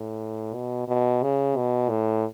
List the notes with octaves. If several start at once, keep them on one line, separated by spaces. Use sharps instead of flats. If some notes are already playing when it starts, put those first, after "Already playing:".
Already playing: A2
B2
B2
C#3
B2
A2